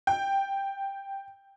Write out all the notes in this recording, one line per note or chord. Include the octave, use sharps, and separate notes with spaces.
G5